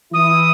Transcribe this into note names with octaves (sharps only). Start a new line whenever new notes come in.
E3 E4 D#6